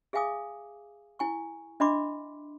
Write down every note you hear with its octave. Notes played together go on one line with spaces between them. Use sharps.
G#4 E5 F5 G#5 D6 D#6
E4 G#5 C#6
D4 D#5 E5 B5 C6 D6